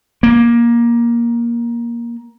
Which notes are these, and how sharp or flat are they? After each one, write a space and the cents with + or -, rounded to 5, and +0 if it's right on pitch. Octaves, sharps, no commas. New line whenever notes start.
A#3 +15